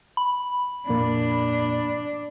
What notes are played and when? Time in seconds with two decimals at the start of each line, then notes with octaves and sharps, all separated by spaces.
0.17 B5
0.89 F2 A#2 A#3 D4